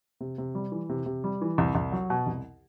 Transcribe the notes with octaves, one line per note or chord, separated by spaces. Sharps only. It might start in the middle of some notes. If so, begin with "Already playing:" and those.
C3
C3
G3
E3
C3
C3
G3
E3
C2
C2
F#3
B2
C2